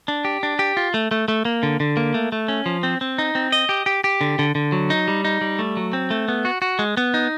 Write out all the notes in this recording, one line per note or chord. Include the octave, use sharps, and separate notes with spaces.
D4
G4
D4
G4
F4
A3
A3
A3
A#3
D3
D3
A#3
A3
A3
C#4
F3
C4
C4
D#4
C4
D#5
G4
G4
G4
D3
D3
D3
F#3
D#4
G3
D#4
G3
A3
F#3
C4
A3
B3
F#4
F#4
G#3
B3
D#4